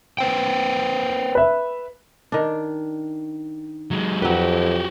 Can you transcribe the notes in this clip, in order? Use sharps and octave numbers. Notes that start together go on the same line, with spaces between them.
B4 C5 G5
B4 E5
D#3 D4
F#3 G#3
F2 F#3 F#4 G4 B4